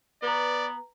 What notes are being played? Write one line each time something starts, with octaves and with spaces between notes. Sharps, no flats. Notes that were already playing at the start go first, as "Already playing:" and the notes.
B3 B4 D5 A#5